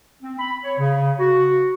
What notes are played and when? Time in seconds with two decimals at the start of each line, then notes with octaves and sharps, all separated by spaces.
0.22 C4
0.38 B5
0.64 C#5
0.78 C#3
1.19 F#4